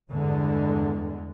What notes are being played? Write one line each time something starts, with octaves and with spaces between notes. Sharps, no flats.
E2 G2 D3 G#3